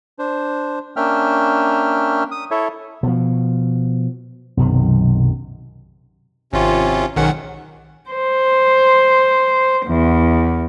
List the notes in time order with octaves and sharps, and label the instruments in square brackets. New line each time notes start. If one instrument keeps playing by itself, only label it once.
[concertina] D4 C5
A#3 C#4 D4 E5 G5 F6
D#6
E4 A4 C#5 E5
[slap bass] B2 F3
B1 F#2 C3 D#3
[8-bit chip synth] G#1 F4 [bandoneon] C3 C#4
[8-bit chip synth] B1 D#3 F#5 [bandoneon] G#2 C#4
[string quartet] C5
E2